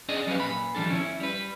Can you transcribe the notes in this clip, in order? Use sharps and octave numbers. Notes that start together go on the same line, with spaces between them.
C#4 D4 G#4 D5 D#5
F#3 C#4 G4 A#4 B4 F5
A#2 B5
D#3 F3 G3 D4 A4
C#4 E4
G3 B4